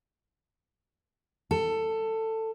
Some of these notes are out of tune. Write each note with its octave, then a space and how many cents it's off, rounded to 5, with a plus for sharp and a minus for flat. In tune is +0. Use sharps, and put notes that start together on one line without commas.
A4 +15